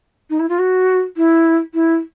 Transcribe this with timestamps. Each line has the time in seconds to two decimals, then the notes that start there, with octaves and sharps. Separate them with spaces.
0.30 D#4
0.39 E4
0.49 F4
0.58 F#4
1.16 E4
1.74 E4